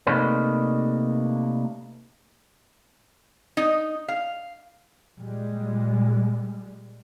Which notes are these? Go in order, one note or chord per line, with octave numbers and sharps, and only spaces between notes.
C3 A3 A#3 D4 D#4 B4
D#4
F5
A#2 G3 G#3